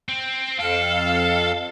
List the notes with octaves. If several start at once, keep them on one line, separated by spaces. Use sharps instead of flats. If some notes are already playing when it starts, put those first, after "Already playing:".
C4
F2 A4 F5